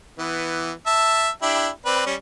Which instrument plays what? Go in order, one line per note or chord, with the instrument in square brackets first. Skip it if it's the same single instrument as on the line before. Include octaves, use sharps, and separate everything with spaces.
[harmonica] E3 B3
E5 A5
D4 E4 G4
C4 B4 D5
G3 C#4